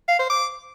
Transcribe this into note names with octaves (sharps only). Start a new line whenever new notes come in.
F5
C5
D6